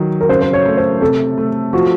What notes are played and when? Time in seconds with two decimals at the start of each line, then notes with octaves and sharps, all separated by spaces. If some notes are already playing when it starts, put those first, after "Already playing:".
Already playing: D#3 F#3
0.21 A#4
0.29 C#3 C5
0.41 C5
0.53 C#5
0.66 A3
0.77 C5
1.01 C3 A4
1.38 A3
1.73 F3 F#4